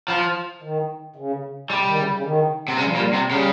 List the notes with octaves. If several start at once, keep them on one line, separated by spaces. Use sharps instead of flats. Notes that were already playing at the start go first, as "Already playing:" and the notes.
F3
D#3
C#3
C3 G3
D#3
C#3
C#3
D#3
C3
C#3 G3
F3
A#2 G3
C3
C#3 G3